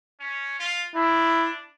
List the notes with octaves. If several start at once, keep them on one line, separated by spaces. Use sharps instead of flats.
C#4
F4
D4 E4